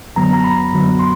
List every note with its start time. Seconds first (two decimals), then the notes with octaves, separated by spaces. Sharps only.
0.16 F#2 D3 F#3 B3 A#5
0.33 A#5
0.44 B5
0.71 F#2 D3 F#3 B3
0.99 C6